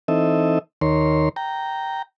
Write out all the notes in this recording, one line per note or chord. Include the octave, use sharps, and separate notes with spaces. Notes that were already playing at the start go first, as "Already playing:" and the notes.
E3 C4 D#4 A4 D#5 E5
D#2 D#3 A#4 C#5 C6
G5 A#5